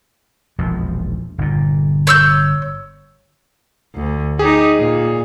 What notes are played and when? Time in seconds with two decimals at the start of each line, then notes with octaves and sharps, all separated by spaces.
0.58 E1 A#1 F3
1.38 G1 A#2
2.07 C#5 E6 G6
3.95 D2
4.39 D#4 G4 G#4
4.79 A#2